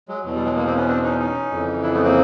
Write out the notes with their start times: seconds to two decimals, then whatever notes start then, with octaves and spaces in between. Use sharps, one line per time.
0.08 F#3 G#3
0.24 E2 B2 F#3
0.35 G3
0.45 F#3 G#3
0.56 G#3 A#3
0.66 A#3 C4
0.76 B3 C#4
0.87 C4 D4
1.03 C#4 D#4
1.19 C#4 D#4
1.51 F2 C#3 E3
1.83 D4 E4
1.93 A3 B3
2.03 A#3 C4